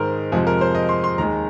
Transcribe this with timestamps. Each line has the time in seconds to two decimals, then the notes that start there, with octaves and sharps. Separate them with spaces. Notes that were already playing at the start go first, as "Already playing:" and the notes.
Already playing: G#2 D#3 G#3 A#4 C5 D#5
0.32 F2 C3 F3 G#3 G#4
0.47 A#4
0.61 C5
0.75 D#5
0.89 C6
1.04 C6
1.18 D#2 D#3 G#3 A#5